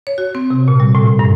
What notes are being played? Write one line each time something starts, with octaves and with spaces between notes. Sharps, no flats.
C#5
F#4
C4
C3
A#2
G3
A2
A2
G2